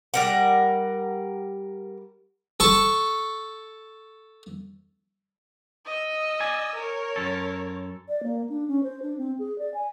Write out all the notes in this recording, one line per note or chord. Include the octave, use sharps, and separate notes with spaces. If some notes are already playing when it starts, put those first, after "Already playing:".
G3 A#4 F#5
A4 C#6
D#5 E6
D5 G#5
A#4 C#5
F#2 A4
D5
A#3
D4
C#4
C5
D4
C4
G#4
D5
G#5